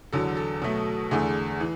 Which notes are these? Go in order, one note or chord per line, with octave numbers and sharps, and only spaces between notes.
E2 D3 F#3 A4
A4
B2 F#3 A3
E2 D3 A3 G#4
E3